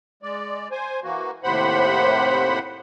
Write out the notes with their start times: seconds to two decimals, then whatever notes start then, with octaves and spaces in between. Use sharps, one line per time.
0.23 G#3 D5
0.71 C5 G#5
1.04 E3 A#3 F#4
1.44 D#2 A2 C3 C5 F#5 B5